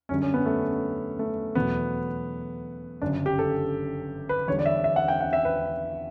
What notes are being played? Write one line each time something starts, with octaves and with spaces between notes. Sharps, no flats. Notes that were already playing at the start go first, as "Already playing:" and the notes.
F#2 D3 G3 C#4
C#4
B3
A3
A3
E2 B2 F#3 A3 B3
G1 F#2 C#3 D4
G4
A4
B4
E2 D3 G3 C#5
D5
E5
E5
F#5
G5
F#5
E5
B4